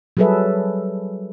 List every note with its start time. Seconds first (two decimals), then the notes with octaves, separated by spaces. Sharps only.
0.17 F#3 G3 G#4 A4 B4 E5